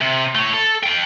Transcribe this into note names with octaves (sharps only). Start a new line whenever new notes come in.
C3
A3 C#5
A4
F5 G5